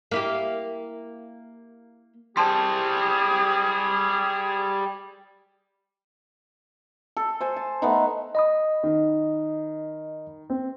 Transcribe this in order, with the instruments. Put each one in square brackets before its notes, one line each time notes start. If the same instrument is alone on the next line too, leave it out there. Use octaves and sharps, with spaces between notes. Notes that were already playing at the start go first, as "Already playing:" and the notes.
[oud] A#3 E4 G4
[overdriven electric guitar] G3 C5 [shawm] G#4 [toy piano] A5 C6
[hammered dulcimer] A4
C5 G#5
A5
A3 B3 D#4
[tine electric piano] D#5 B5 D#6
[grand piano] D#3
C4